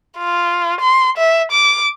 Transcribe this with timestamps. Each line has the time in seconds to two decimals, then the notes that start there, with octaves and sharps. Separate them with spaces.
0.18 F4
0.81 C6
1.17 E5
1.51 D6